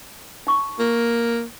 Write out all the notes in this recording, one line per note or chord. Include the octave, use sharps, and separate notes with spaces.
D#4 C#6
A#3